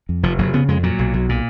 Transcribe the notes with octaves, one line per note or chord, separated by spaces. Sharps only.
F2
F1 F3
F1 F#3
C#3 B3
F2 G#3
A#2 F#3
B1
B1
A#2